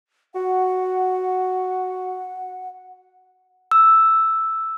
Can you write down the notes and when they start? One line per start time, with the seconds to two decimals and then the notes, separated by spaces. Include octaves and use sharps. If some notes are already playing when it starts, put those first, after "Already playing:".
0.35 F#4 F#5
3.71 E6